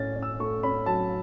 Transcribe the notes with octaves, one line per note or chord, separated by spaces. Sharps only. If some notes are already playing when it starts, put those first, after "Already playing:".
Already playing: A2 C#4 A6
C#4
E6
A3 C#6
C#4 B5
F#3 A5